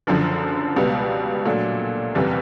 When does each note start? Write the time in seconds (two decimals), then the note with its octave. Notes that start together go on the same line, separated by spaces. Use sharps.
0.07 F#1 F#2 D3 F3
0.76 C#2 B2 G3 B3
1.45 A#2 F#3 A3 D4
2.15 F#1 E2 C3 E3 G3